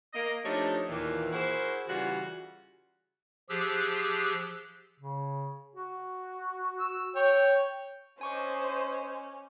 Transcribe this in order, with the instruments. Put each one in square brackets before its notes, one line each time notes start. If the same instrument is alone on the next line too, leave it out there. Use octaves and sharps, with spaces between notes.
[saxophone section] A#3 D#5
F3 A3 D4 D#4 G4 C#5
D#2 A#2 E3
E4 F#4 G#4 A#4 C5
C#3 E3 G3 F4 F#4
[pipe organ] F3 G4 G#4 E6 F#6
[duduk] C#3
F#4
[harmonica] E6
C#5 G5
[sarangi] C#4 [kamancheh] C5 D#5 [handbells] G#5 C#6 D6